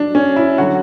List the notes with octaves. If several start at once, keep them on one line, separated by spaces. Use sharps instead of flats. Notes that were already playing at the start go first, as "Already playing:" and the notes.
Already playing: F#3 D4
C#4
E4
D3 F#3 F#4